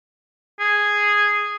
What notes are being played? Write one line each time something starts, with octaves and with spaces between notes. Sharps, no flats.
G#4